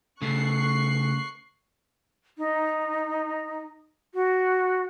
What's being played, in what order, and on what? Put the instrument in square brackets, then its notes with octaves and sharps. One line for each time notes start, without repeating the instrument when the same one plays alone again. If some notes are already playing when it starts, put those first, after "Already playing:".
[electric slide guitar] C#3 A3 [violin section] C#6 F#6 C7
[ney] D#4
F#4